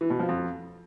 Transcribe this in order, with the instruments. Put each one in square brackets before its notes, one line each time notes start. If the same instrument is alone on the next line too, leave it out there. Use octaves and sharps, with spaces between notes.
[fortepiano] E3
B2
F3
F2